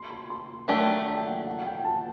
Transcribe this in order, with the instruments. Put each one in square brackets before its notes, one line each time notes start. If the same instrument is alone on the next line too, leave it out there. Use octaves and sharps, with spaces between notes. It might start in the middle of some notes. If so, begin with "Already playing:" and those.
Already playing: [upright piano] C6
C6
C6
[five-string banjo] D#3 F#3 A3 D4 G4 [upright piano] A5
[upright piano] A5
G5
F#5
F#5
F#5
G5
A5